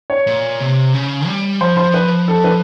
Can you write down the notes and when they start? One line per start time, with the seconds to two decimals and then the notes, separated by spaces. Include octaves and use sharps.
0.10 C#5
0.27 A#2
0.60 C3
0.93 C#3
1.27 G3
1.61 F3 C5
1.77 C5
1.94 B4
2.28 A4
2.44 B4